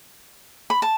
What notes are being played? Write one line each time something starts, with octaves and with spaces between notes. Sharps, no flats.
B5
A5